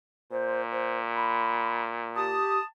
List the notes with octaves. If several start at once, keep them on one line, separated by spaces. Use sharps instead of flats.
A#2 C5
C5
B5
G4 A5 D#6